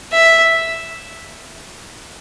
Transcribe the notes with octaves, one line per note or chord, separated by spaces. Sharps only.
E5